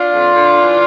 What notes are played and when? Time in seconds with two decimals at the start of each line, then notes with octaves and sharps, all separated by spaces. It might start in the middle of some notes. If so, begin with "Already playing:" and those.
Already playing: D4 F4
0.12 F2
0.35 D3
0.59 E3